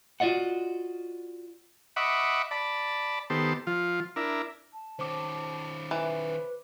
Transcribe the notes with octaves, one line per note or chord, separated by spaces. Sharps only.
F4 F#4 D5 D#5 F#5
D#5 E5 F#5 B5 C#6 D6
D5 A5 B5
D#3 B3 G4 A4 C5
F3 F4
D4 E4 A#4
A5
D#3 C#4 C5 D6
E3 B4